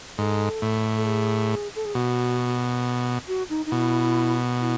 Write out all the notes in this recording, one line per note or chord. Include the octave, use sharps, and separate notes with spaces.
G#2 A4
A2
A4
G#4
A4
G#4
B2 F#4
F#4
D#4
D#4
B2 E4
E4